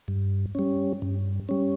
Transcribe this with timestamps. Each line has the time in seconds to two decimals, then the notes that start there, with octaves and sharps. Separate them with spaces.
0.08 G2
0.55 G3 C#4
1.02 G2
1.49 G3 C#4